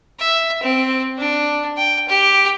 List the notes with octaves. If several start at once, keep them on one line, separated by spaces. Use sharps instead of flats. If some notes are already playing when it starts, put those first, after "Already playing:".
E5
C4
D4
G5
G4